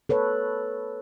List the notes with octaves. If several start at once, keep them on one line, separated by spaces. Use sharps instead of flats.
A4 B4 C#5